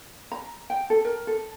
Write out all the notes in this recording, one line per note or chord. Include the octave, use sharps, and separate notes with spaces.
A#5
G5
A4
A#4
A4